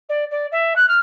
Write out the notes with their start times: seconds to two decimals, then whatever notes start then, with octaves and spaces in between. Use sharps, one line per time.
0.09 D5
0.31 D5
0.51 E5
0.75 F#6
0.88 F6